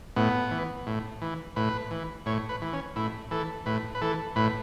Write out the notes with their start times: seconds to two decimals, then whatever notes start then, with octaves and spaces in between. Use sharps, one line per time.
0.16 A2 B3
0.51 E3
0.87 A2
1.22 E3
1.56 A2 B4
1.91 E3
2.26 A2 C#5
2.49 B4
2.62 E3
2.73 C#4
2.96 A2 E4
3.31 E3 A4
3.66 A2 B4
3.95 B4
4.01 E3 A4
4.36 A2 B4